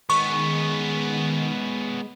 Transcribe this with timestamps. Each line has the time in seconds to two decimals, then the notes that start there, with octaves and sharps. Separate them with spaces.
0.10 D#3 G#3 B3 C#4 C#6